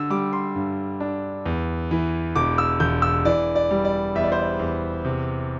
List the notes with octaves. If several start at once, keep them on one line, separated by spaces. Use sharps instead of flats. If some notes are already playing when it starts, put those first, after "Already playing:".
Already playing: D3 E6
G3 D6
C6
G2
D4
E2
E3
E1 D6
E6
E1 G6
E6
E3 D5
D5
G3
D5
E2 E5
D5
C5
D5
E2
C3